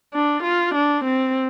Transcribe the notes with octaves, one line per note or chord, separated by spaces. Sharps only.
D4
F4
D4
C4